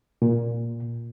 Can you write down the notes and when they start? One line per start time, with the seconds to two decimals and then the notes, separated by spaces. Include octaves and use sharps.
0.22 A#2